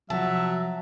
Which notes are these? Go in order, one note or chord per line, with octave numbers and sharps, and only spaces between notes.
C3 F3 F#3 F#4 E5 A5